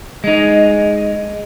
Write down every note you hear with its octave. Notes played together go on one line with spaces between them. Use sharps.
G#3 D#4